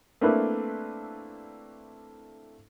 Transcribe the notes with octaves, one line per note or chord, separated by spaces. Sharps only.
A3 A#3 C4 D4 E4 B4